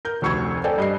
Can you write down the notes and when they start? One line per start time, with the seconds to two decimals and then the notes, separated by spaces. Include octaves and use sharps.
0.05 A#4 G6
0.22 F1 D2 C#6 E6 G#6
0.64 A4 C5 D5 G5 G#5
0.78 G2 D#5 C7